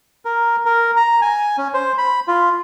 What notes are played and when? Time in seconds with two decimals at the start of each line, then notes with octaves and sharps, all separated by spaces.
0.25 A#4
0.65 A#4
0.96 A#5
1.22 G#5
1.58 C#4
1.74 C5
1.98 B5
2.28 F4